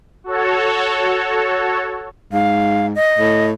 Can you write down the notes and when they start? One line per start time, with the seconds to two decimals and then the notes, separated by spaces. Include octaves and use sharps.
0.24 F#4 A4 C#5
2.33 G#2 F5
2.96 D#5
3.19 A2